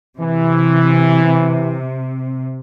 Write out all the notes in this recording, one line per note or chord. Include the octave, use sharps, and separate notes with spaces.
C3 E3